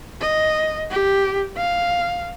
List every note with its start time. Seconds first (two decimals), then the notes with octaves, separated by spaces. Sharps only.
0.21 D#5
0.90 G4
1.57 F5